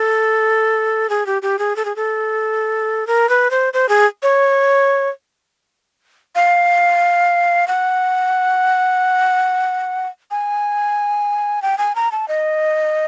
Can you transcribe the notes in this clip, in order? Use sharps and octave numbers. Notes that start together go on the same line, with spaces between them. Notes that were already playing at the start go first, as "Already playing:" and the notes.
Already playing: A4
G#4
G4
G4
G#4
A4
G#4
A4
A#4
B4
C5
C5
G#4
C#5
F5
F#5
G#5
G5
G#5
A#5
A5
D#5